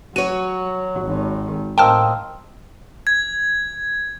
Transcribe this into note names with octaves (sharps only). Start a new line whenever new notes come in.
F#3 F#4 C#5 D#7
G#1 D#3
A2 A#3 C4 D#5 G5 A5 F6
G#6